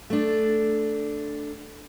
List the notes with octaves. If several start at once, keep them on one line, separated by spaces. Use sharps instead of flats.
A3 D4